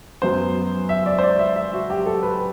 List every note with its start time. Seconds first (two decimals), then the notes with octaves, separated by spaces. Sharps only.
0.22 F#2 F#3 B3 C5
0.89 E5
1.06 D5
1.18 C5
1.23 D5
1.39 E5
1.56 E5
1.73 F#4
1.90 G4
2.06 A4
2.23 B4